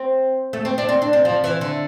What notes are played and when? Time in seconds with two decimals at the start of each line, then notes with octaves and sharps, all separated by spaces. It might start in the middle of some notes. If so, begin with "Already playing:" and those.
Already playing: C4
0.53 A3
0.65 C4
0.78 D4
0.89 C4
1.02 D4
1.13 C4
1.25 F3
1.44 E3
1.61 D3